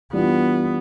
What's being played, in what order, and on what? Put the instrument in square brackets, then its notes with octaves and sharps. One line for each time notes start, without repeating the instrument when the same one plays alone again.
[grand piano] E3 G3 D4 F4 [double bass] B3